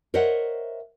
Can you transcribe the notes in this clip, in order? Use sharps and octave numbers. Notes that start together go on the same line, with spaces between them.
A#4 C5 C#5 D#5 E5 F#5